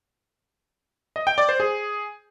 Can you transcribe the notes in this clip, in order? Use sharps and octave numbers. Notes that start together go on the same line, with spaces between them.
D#5
G5
D5
C5
G#4